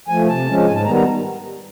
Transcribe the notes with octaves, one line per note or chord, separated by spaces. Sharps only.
F3 A3 G#5
C3 A5
F3 G#3 C#4
G#2 G#5
A5
D#3 G3 B3 A#5
A#5